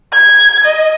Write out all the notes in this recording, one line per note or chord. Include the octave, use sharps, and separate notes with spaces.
G#6
D#5